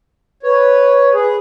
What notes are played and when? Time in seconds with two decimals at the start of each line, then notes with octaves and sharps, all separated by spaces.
0.43 B4 C#5
1.13 G#4